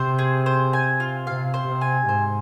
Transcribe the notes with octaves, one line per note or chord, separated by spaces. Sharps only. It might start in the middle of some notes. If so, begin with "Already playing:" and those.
Already playing: C3 C5
G#4
C5
G#5
F4
C3 F5
C5
C3
G#5
G#2 C5